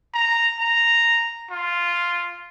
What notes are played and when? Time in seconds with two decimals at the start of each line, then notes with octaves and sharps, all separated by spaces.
0.14 A#5
0.60 A#5
1.51 F4